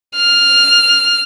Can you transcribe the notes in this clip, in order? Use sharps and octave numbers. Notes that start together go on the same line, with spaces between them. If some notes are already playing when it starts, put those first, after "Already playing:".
F6